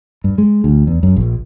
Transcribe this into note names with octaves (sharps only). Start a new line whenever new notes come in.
G2
G#3
D2
E2
F#2
A#1